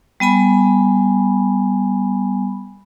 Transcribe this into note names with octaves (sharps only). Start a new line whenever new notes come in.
G3 B3 G#5 B5